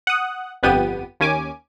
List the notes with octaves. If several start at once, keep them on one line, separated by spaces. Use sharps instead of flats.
F#5 D#6
G1 F2 B3 G4 D#7
D#2 C#4 G#5 D6